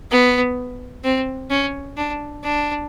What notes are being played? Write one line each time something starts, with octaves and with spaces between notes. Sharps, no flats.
B3
C4
C#4
D4
D4